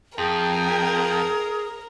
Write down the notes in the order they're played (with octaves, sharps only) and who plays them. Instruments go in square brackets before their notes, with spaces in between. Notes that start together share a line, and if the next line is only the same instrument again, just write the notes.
[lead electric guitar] F2 [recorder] G#4 [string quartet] A#4 [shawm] G5